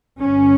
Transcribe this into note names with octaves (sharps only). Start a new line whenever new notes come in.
G1 G2 C#4